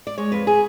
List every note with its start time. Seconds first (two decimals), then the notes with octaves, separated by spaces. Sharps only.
0.07 D5
0.18 G#3 C#5
0.32 F2 B4
0.47 G#4